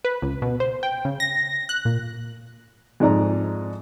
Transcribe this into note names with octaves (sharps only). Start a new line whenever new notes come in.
B4
C#2
B2
C5
G5
C#3
A#6
F#6
A#2
F2 G#2 F4 D5 A#5